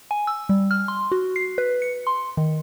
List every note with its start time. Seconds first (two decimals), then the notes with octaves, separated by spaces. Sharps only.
0.11 G#5
0.27 E6
0.49 G3
0.71 F6
0.88 C6
1.12 F#4
1.36 C7
1.58 B4
1.82 C#7
2.07 C6
2.37 D#3